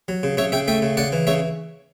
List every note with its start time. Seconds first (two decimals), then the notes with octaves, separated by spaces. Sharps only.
0.08 F#3
0.23 C#3
0.37 C#3 C#5 E5
0.52 C#3 E5 G5
0.68 A3 E5 G5
0.82 C#3
0.97 C#3 D5 F#5
1.12 E3
1.27 C#3 C#5 E5